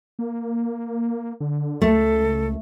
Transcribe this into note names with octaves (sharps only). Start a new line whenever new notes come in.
A#3
D3
C#2 A3 A4